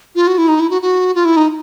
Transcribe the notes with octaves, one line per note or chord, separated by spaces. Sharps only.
F4
F#4
E4
D#4
E4
F#4
F#4
F4
E4
D#4